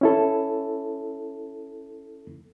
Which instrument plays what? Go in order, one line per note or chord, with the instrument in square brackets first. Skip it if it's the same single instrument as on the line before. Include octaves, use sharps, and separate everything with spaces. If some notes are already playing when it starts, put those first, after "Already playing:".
[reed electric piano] C#4 E4 A4